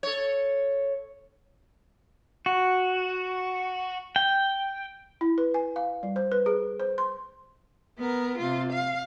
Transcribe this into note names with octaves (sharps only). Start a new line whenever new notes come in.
A4 C#5
F#4
G5
E4
B4
G#5
F5
G3
C5
B4
G#4
C5
C6
B3 A#4
C3 F4
F5